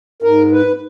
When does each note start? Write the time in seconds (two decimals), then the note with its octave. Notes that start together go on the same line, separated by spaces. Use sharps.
0.22 G#2 A#4
0.52 B4